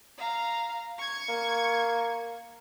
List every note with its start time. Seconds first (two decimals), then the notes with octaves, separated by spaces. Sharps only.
0.18 F5 A#5
0.98 C#6 G#6
1.29 A#3